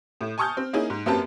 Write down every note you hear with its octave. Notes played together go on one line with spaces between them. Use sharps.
A2
G#5 A5 C#6 D#6 F6 G6
C4
A#3 C#4 D#4 E4 G#4
G#2
F#2 A#3 C4 G4 B4 A5